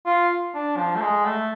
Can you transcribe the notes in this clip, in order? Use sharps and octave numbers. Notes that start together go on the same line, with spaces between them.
F4
D4
F3
A3
G#3
A3